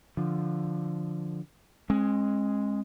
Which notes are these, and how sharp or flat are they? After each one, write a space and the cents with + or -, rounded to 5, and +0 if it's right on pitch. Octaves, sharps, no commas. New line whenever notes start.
D3 +0 F3 +0
G#3 +0 C#4 -45